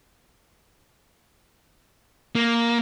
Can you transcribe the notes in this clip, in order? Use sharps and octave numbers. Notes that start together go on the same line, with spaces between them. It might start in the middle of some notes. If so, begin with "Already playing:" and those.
A#3